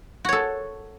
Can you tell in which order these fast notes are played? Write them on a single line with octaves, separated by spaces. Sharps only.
F#4 C#5 A4